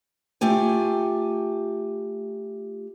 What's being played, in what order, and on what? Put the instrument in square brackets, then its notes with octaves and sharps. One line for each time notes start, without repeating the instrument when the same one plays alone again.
[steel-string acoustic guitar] A3 F4 G4 G#5